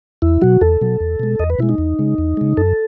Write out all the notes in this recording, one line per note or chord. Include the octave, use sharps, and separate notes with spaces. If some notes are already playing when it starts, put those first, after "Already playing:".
E2 E4
B2 F#3 F#4
E2 A4
B2 F#3
E2
B2 G#3
E2 D#5
B4
B2 G#3 E4
D#4
E2
C#3 G#3
E2
C#3 G#3
F#2 A4